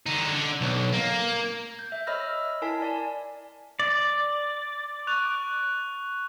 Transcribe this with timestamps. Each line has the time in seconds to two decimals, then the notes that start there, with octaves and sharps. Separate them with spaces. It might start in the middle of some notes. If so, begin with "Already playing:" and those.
0.06 D3 D#4
0.33 D3
0.61 B1
0.92 A#3
1.79 G6
1.92 E5
2.07 C#5 D#5 B5 E6 F6 A#6
2.62 E4 A#4 G#5 A5 B6
2.82 D5 G#5
3.80 D5
5.07 C#6 F#6 F7